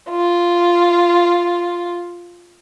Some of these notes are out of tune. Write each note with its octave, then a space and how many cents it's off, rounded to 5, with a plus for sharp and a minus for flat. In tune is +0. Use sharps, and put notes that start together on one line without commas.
F4 -5